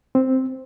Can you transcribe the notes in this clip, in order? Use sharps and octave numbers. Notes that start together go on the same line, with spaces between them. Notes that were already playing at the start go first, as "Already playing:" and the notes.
C4